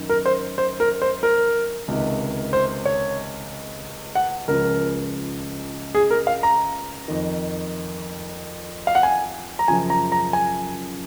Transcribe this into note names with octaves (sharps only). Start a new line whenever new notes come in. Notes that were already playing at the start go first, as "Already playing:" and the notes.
Already playing: F#2 D#3
A#4
C5
C5
A#4
C5
A#4
C#2 C3 D#3
C5
C#5
F#5
C#2 C#3 F3 A#4
G#4
A#4
F5
A#5
F2 D#3
F5
F#5
G#5
A#5
F#2 C#3 F3 G#5
A#5
A#5
G#5